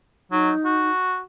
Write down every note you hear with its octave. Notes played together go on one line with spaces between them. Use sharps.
F#3 D#4
F#4